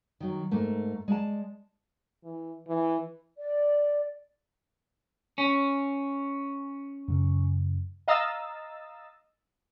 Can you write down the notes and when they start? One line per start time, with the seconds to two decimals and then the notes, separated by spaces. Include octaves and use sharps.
0.20 D#3 F#3
0.51 G#2 A3 A#3
1.08 G#3 D5 A5
2.24 E3
2.67 E3
3.38 D5
5.38 C#4
7.08 F#2 C#3
8.08 D#5 F5 A#5 D#6 E6 A6